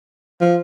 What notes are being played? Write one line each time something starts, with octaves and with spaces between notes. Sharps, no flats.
F3